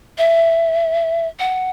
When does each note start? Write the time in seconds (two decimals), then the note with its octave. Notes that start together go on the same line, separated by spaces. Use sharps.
0.18 E5
1.39 F#5